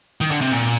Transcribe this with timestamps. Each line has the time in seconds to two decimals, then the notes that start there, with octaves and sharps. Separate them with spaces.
0.21 D#3
0.31 D3
0.41 C3
0.51 A#2